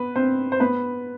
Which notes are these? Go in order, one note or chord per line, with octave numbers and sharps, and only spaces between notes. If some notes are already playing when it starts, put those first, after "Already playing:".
Already playing: B3 B4
C4 C5
C5
B3 B4